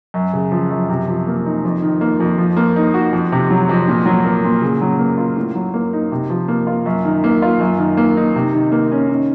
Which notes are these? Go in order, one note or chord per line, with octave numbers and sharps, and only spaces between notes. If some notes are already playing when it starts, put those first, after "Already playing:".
F#2
C#3
F3
F#2
C3
F3
A#3
D#4
F2
D#3
A#3
F2
F3
A#3
D#4
F#4
F2
C3
F#3
F2
A#2
F#3
A#3
A#2
C#3
F#3
A#3
F4
A2
F#3
A#3
D#4
C3
F3
A#3
F4
F#2
D#3
A#3
F4
F#2
D#3
A#3
D#4
C3
D#3
A#3
C#4
D#3